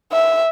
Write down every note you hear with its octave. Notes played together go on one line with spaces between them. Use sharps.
E5